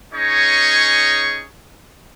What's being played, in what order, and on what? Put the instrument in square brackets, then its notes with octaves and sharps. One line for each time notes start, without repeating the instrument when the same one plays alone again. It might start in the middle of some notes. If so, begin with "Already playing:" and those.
[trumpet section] C#4 D#4 G#4 C#5 D#5 C#6